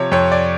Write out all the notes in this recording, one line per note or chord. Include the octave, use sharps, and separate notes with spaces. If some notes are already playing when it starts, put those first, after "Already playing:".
Already playing: C3 F3 C#5
F2 C#5
D5